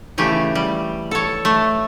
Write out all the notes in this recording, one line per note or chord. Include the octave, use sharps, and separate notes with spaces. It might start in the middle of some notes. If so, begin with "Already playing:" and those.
C#3 E3 A3 G4
G3
A4 C#5
A3